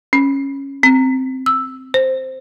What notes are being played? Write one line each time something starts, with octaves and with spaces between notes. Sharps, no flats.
C#4
C4
E6
C5